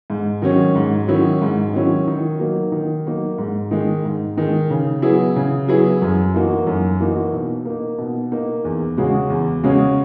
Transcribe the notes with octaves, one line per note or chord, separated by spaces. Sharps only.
G#2
D#3 F#3 C#4
G#2
D#3 F#3 C#4 E4
G#2
D#3 F#3 C#4 E4
D#3
F#3 A#3 D#4
D#3
F#3 A#3 D#4
G#2
D#3 G#3
G#2
D#3 G#3
C#3
F#3 B3 E4 G#4
C#3
F#3 B3 E4 G#4
F#2
E3 A#3 D#4 F#4
F#2
E3 A#3 D#4 F#4
B2
A#3 D#4
B2
A#3 D#4
E2
C#3 G#3 C#4 F#4
E2
C#3 G#3 C#4 F#4